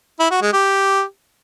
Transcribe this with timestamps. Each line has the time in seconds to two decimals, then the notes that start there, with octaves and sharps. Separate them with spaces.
0.19 E4
0.30 F#4
0.42 G#3
0.53 G4